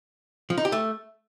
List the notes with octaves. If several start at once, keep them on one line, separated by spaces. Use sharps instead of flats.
F3
D#4
G4
A3